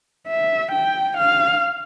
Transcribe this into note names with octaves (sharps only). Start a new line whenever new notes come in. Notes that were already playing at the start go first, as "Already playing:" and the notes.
E5
G5
F5